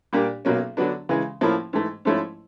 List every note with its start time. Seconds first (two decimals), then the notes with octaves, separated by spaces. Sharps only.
0.13 A#2 G3 A#3 D4 G4
0.45 B1 B2 F#3 A#3 C#4
0.77 D3 F#3 B3 D4
1.09 C#3 E3 G#3
1.41 A2 F3 A#3 C#4 E4
1.73 G#2 E3 A3
2.05 G#2 F3 A3 C#4 E4